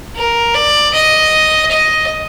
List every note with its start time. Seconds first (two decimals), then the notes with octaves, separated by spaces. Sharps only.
0.16 A#4
0.54 D5
0.94 D#5
1.72 D#5